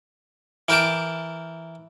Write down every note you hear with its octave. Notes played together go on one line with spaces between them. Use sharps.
E3 A#4 G5 A5 D6